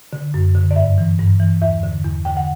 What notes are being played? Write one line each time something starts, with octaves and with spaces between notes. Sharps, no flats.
D3
F#2
D3
D5
G2 E5
E3
G2
E3
E2 E5
D3
E2
D3 G5
F#5